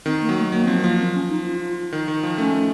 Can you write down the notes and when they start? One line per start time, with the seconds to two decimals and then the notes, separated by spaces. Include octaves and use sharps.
0.06 D#3 C4
0.22 A#3
0.29 F#3
0.37 A3
0.52 F#3 A#3
0.65 F3 C4
0.78 A#3
0.84 F3
0.99 C4
1.14 C#4
1.30 D#4
1.45 F4
1.92 D#3
2.08 D#3
2.23 F3
2.38 A3 C#4
2.51 A3